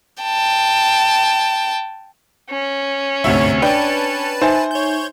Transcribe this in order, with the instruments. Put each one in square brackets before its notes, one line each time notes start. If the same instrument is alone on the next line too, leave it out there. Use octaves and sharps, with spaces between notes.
[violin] G5 A5
[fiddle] C#4
[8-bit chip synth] G1 G#2 C#5 [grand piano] D2 C3 E5
[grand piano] D4 G5 [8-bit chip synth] B4 A5
[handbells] D#4 E5 G#5 [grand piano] C5
[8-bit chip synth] C#5 G6